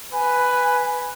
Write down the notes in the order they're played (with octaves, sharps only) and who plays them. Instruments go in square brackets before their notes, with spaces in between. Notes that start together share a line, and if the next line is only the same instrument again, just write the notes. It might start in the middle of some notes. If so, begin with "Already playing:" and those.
[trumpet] B4 [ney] G#5